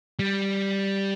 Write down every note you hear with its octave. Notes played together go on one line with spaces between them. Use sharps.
G3